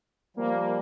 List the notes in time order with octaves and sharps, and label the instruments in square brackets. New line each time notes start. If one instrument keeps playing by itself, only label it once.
[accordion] F3 G3 [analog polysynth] A#3